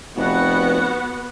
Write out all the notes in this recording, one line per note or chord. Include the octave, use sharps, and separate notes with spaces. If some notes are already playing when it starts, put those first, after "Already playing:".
F1 B3 F#4 F#5